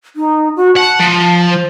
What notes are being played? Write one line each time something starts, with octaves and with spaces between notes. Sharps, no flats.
D#4
F#4
F#5 A5
F3
C5